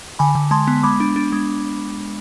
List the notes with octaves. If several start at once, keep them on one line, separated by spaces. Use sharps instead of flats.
D3 G#5 B5
D3
G#3 A5 C6
B3
G#3 B5 D6
D4
D4
G#3